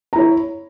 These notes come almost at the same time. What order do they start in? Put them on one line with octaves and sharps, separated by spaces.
A#5 E4 C#5